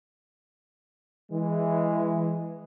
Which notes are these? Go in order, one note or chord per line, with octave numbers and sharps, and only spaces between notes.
E3 G#3